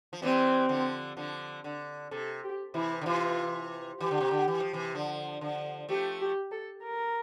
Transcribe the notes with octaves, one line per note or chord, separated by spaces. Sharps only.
F3
E3 G3 C4
D3 F3
D3 F3
D3
C3 A4
G4
C3 E3 E4
D3
C3 E3 F4
E3 G4
D3
C3
D3
E3
F3
C3 E3
D3 F3
D3 F3
F3 A3 G4
G4
A4
A#4